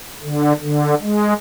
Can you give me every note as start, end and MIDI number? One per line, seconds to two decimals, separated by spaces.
0.23 0.53 50
0.61 0.94 50
1.02 1.33 56